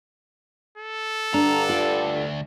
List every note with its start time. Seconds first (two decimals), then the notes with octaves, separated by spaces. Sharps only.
0.78 A4
1.34 G2 D3 D4 A#5
1.69 D2 F4 D5